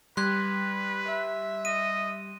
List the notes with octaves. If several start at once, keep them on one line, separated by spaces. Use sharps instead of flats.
G3 B4 C6 F#6 G#6
E5
D#5 D#7